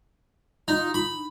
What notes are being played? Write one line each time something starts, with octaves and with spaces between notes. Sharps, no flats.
D#4 F4
D#4 B5